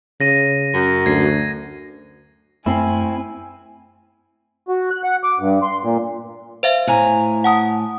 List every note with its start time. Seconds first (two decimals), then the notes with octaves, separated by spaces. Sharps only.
0.21 C#3 A#6 D#7
0.74 F#2
1.06 D2 G#6 C7
2.66 F#2 A3 C4 E4 G#5
4.68 F#4
4.91 F#6
5.04 F#5
5.24 D6
5.39 G2
5.62 C6
5.83 A#2
6.63 C5 E5 F5
6.87 A2 G#5 A#5
7.44 F#5 A5 D#6